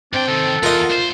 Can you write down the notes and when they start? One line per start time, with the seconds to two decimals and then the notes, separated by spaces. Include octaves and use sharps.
0.13 G#2 C4 D4 G5
0.28 C3 D#3 A4
0.63 E2 F4 A#4 D#5
0.90 D2 C5